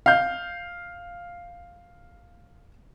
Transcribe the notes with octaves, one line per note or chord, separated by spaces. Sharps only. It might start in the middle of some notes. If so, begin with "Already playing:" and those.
F5 G6